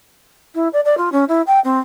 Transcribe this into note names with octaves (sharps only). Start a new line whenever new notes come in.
E4
D5
D5
F4
C#4
E4
G5
C4